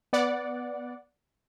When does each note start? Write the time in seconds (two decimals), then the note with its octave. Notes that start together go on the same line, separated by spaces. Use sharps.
0.13 B3 D5 F#5